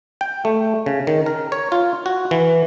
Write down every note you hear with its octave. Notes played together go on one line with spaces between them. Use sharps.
G5
A3
C#3
D#3
A#4
C#5
F4
F#4
E3